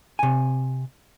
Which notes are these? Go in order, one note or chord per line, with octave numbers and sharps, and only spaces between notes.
C3 G#5